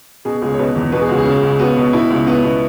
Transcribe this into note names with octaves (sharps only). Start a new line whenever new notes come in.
B2 G#4
C#2 G#4
C#5
B2 B4
E2
B2 B4
G#4
C#2 F#4
G#4
C#3
C#2
B3 F#4
B2
B2 E4
C#2
B3
B2